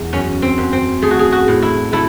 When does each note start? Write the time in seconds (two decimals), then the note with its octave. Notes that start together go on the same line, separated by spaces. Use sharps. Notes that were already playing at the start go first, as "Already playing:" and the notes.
Already playing: E2
0.13 F#2 C#4
0.42 C4
0.58 F#2
0.73 C4
1.02 A3 G#4
1.11 F#4
1.19 G#4
1.32 F#4
1.48 A2
1.62 E4
1.93 A3 E4